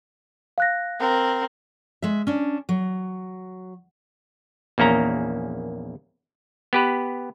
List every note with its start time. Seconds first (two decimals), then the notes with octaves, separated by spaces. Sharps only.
0.58 F5 F#6 A#6
1.00 C4 A#4
2.02 G#3 E5
2.27 C#4 D4
2.69 F#3
4.78 A#1 E2 A#3 C#4 A#5
6.73 B3 G4 B4